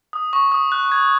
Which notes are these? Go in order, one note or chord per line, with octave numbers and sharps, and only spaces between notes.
D#6
C#6
D#6
F#6
G#6